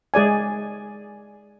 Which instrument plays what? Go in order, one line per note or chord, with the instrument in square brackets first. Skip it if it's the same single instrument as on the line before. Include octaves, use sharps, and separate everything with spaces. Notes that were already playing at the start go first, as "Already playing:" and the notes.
[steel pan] G#3 G#4 D5 G#5